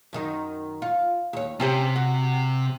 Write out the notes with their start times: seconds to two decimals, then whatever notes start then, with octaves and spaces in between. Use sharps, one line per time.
0.13 F#2 D#3 D#4
0.82 F4
1.33 D#2 C#5
1.60 C3 C#4 G4 C5
1.96 F#4